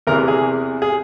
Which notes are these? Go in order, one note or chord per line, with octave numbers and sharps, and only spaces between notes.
E2 C3 E3 A#4
G#4
G#4